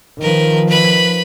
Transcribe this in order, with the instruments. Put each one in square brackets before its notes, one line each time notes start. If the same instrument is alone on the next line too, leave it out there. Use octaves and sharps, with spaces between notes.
[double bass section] D#3 F3 [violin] A#4 B4
[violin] B4 B5